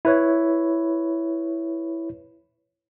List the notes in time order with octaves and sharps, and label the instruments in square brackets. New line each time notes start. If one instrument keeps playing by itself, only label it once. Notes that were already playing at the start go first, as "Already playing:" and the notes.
[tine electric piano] E4 B4 C#5